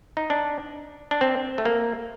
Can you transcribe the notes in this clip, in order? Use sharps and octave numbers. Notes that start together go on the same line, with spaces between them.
D#4
D4
D4
C4
A3
A#3